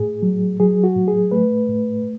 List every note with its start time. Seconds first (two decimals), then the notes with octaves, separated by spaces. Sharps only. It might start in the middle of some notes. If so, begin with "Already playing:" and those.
Already playing: A2 G#4
0.22 F#3
0.60 F#3 G#4
0.84 F#4
0.96 A2
1.08 G#4
1.31 A3 B4
1.68 A2